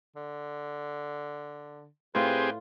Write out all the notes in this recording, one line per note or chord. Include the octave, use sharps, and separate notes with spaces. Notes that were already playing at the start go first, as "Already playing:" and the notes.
D3
A2 C4 F4 G4 G#4 B4